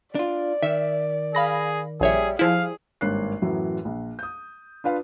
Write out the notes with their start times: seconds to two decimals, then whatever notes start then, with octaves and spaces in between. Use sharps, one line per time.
0.15 D4 F4 D5
0.63 D#3 E5
1.35 G#4 F5 B5 A#6
2.01 A#1 G3 G#4 C#5 E5
2.39 F3 E4 G#4 F5
3.01 G#1 G2 A#3 C#5 F#6 C7
3.42 F#2 A2 E3 F#3
3.85 A#1
4.19 D#6 G6
4.84 D4 F4 B4 F5